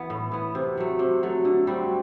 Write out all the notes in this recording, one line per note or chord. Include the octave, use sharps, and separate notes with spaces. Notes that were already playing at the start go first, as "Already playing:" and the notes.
Already playing: E3 B3
A2
E3 B3
C3
F#3 A3
C3
F#3 A3
D3
G3 C4 F#4